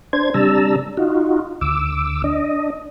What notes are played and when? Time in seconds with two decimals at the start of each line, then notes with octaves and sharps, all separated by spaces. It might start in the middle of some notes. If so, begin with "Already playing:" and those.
0.13 D4 C5 G#6
0.34 C3 G3 D4 A5 A#5 E6
0.97 D#4 F4 F#4
1.61 D2 D6 E6
2.24 D4 D#5